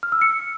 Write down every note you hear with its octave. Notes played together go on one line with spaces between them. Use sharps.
F6
E6
C#7